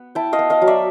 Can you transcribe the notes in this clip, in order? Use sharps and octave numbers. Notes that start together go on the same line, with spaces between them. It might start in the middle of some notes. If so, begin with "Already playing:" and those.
Already playing: B3
E4 G5 A5
D#5 F5
B3
D#5 F5
F#3
D5 E5